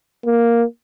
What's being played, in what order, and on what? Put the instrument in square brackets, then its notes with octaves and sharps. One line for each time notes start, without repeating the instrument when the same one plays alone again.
[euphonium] A#3